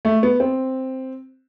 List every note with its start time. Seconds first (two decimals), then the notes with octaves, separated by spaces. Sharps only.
0.05 A3
0.23 B3
0.40 C4